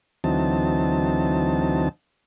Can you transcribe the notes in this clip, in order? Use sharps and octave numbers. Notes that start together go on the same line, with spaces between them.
D2 E3 F#3 C4 D#4 A5